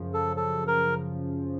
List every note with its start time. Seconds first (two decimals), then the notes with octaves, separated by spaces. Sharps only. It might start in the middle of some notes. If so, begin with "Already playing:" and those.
Already playing: F#2 C#3 F3
0.14 A4
0.37 A4
0.67 A#4